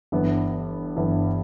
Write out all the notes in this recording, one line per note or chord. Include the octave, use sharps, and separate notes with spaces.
G1 G2 E3 B3
G1 G2 E3 B3